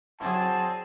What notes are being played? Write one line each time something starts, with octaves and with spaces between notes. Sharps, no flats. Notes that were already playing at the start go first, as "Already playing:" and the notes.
F#3 C4 D4 E4 G#4 A5